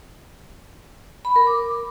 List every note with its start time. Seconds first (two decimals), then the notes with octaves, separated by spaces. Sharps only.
1.25 B5
1.36 A#4
1.47 D6